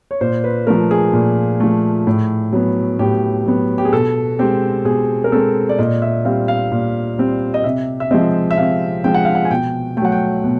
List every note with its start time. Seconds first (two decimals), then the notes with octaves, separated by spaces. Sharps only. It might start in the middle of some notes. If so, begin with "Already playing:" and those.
0.11 C#5
0.21 A#2 C5
0.44 B4
0.67 F3 A3 A#4
0.91 G#4
1.13 A#2
1.60 F3 A3
2.07 A2
2.53 F#3 B3
2.99 A2 G4
3.46 F#3 B3
3.78 G4
3.85 G#4
3.93 B2 A4
4.39 G#3 C4 G4
4.85 B2 G#4
5.24 A#4
5.32 G#3 C4 A4
5.69 D5
5.78 A#2 D#5
6.02 E5
6.25 G3 C4 F5
6.48 F5
6.71 A#2
7.18 G3 C4
7.54 D#5
7.64 C3 E5
8.00 E5
8.11 F3 G#3 C4 D#5
8.51 E5
8.58 C3 F5
9.04 F3 G#3 C4 G5
9.14 F#5
9.25 F5
9.35 F#5
9.45 G#5
9.50 B2 G5
9.97 A3 G5
10.02 F#3 F#5
10.12 G5
10.44 B2